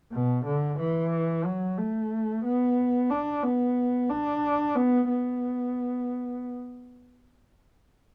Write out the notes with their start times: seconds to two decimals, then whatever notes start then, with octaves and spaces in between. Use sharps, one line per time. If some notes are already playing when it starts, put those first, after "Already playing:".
0.12 B2
0.45 D3
0.79 E3
1.45 F#3
1.78 A3
2.44 B3
3.10 D4
3.43 B3
4.09 D4
4.75 B3
5.09 B3